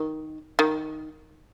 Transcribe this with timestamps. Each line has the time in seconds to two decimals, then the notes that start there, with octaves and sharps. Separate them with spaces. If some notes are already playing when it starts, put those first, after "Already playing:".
Already playing: D#3
0.59 D#3